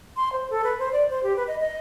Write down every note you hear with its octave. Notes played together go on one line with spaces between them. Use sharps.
C6
C5
A4
B4
C5
D5
C5
G4
B4
D#5
D#5